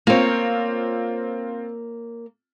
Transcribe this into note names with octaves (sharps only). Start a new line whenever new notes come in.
A#3 C4 F4 C#5